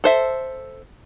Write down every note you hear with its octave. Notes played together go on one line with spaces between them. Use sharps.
A4 C5 E5